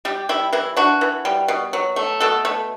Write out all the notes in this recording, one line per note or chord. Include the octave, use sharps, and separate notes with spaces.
G3 G4
G3 E4
E3 E4
D4 F#4
E3
G3
B2
F#3
A3
B2 A4
A3